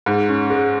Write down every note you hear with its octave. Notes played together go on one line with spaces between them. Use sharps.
G#2
C#4
G#3